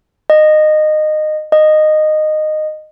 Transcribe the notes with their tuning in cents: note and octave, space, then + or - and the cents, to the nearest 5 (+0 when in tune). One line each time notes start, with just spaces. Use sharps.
D#5 -20
D#5 -15